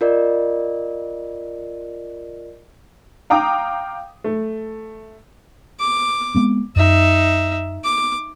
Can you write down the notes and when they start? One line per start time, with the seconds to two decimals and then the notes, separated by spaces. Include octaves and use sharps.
0.01 F4 A#4 D5 D#5
3.30 F5 G5 A#5 D6 D#6
4.24 A3
5.80 D6
6.35 G#3 B3 C4
6.76 F#2 D#4 E5
7.84 D6